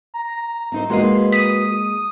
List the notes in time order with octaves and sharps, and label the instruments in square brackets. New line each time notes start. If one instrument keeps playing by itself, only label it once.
[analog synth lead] A#5
[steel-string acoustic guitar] C4 D#4 C5
[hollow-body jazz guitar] G#3 A#3 D#4 [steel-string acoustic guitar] F#4 B4 [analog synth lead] C6
[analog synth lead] D#6 [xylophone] B6